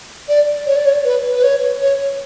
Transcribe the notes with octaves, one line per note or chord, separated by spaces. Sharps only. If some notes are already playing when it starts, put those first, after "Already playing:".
D5
C#5
D5
C#5
B4
B4
C#5
C#5